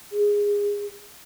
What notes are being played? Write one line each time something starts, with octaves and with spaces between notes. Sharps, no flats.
G#4